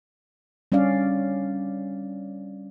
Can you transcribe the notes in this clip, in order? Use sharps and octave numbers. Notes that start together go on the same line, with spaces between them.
G3 C#4 D4 D5 F5